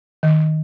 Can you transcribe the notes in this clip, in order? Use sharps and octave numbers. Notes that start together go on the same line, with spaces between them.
D#3